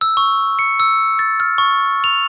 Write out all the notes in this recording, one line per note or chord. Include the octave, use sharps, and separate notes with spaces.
E6
C#6
C#7
E6
A6
F6
C#6
F7